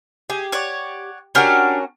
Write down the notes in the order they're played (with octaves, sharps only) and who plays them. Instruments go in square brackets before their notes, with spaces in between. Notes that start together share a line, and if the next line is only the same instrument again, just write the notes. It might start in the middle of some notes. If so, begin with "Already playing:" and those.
[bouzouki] G4 [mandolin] G#4
[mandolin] C#5 D5 F#5
[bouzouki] C#4 F#4 A#4 [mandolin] D4 G4 F6